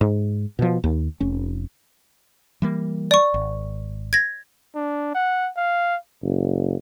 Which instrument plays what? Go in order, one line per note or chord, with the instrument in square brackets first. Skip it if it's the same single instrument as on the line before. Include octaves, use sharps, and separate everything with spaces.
[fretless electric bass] G#2
B2 F3
D#2
F1 C#4
E3 G3 A#3
[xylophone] D5 C#6
[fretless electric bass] G#1
[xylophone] G#6 A#6
[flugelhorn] D4
F#5
F5
[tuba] F#1